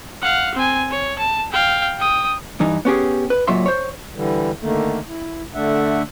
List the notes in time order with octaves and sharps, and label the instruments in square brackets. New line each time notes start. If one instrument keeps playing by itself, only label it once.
[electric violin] F5 F#5
C4 G#5
C#5
A5
F5 G5
G5 D#6
[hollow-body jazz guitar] G2 E3 D#4
B3 C#4 G4 G#4
B4
C#2 A#2 F#3 C#5 E5 C6
C5 C#5
[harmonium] D3 E3 G3
D3 D#3 A3 A#3
E4
D3 A3 D4 E5 F#5